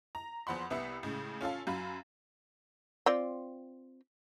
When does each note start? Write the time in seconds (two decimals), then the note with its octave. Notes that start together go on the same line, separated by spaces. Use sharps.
0.15 A#5
0.47 E2 F3 F#5 B5 C6
0.70 C2 B3 E5 B5 C#7
1.03 A2 C#3 G#3
1.41 C#4 F4 A4 F5
1.67 F#2 F#3 F5 B5
3.06 C4 F4 D5